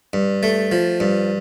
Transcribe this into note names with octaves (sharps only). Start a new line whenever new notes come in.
G2
A3
F3
G2